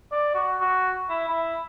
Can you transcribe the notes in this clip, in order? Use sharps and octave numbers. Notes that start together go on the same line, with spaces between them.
D5
F#4
F#4
E4
E4